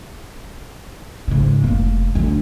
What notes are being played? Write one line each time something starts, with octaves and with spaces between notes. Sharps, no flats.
G#2 C#3
F1 A#3
D2 D4